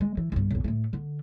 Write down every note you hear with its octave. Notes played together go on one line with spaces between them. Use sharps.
G#3
E3
B1 G2
B1 F#2
A2 A3
D3